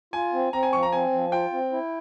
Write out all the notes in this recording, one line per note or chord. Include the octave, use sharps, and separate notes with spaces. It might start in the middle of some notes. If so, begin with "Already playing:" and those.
F4 G#5
C4
C4 A#5
G#5
F3 C#6
A#5
C4 G#5
F3
F4 G5
C4
E4